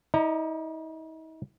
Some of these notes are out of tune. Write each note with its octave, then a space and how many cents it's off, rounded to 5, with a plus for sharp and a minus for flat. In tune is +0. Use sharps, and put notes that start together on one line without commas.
D#4 +45 D#5 -40 A#5 +0